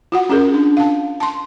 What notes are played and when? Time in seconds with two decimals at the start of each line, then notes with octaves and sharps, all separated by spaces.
0.12 F4 F#4 F#5
0.29 C#4 F4 G#4 A#4
0.54 D4
0.77 F5 A5
1.20 A5 C6